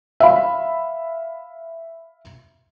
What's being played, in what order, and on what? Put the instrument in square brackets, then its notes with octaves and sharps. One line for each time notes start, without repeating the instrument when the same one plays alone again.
[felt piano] E5 F5 B5